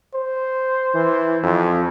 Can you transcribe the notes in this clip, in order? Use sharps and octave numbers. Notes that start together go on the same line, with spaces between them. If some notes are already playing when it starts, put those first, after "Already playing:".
C5
E3
F2